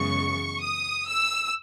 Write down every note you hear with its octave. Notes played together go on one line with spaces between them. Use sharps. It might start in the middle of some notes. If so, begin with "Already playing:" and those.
Already playing: F#2 C#3 E3 G#3 B3 C#6
D#6
E6